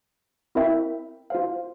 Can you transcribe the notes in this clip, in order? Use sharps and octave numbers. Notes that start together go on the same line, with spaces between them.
C4 E4 A#4 E5 G5
F4 C5 F5